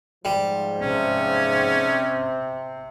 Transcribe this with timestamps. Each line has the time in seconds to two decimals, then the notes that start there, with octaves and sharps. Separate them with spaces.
0.25 G#2 F3 G3
0.82 C3 C4 C#4